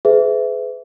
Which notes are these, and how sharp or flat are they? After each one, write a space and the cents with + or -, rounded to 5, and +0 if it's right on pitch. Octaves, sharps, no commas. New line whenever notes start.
G#4 +30 B4 +40 E5 +0